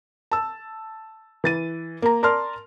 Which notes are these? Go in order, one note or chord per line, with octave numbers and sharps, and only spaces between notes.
A5 E6
E3 A6 D#7
A#3 A#5
A#4 D5 A5 C6 F6